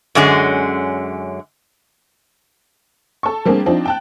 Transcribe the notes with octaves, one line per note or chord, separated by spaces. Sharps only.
F#2 D3 G#3 C#4
A4 C#6
G3 A#3 C4 D4 G#4
F3 C4 D4 D#4 F4
G5 A5 F#6